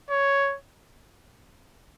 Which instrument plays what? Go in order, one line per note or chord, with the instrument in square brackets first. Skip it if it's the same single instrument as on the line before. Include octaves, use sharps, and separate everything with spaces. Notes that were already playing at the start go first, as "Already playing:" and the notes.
[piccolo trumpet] C#5